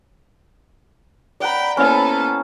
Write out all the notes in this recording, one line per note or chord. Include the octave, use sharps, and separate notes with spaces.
D5 F#5 G5 A#5 B5
A#3 B3 C#4 E4 A4 C5